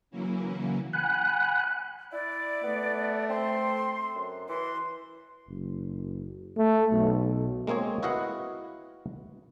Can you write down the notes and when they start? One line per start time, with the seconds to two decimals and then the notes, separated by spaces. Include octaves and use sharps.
0.11 C#3 E3 F#3 A#3 C#4 E4
0.93 F#5 G#5 B5 F#6
2.12 E4 D5
2.63 A3 B3
3.29 C4 C6
4.15 F#2
4.49 E3 C6
5.48 F#1
6.57 A3
6.92 B1
7.67 G#3 A#3 C4 G#4 C#5
8.03 E4 F#4 B4 D#5 F5 F#5